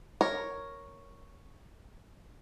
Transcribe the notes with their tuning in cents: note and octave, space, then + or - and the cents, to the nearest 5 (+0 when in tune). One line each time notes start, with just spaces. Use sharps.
A#4 +0 C#5 +0